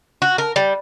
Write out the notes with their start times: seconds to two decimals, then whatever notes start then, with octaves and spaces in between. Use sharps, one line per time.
0.22 F#4
0.38 A#4
0.56 G3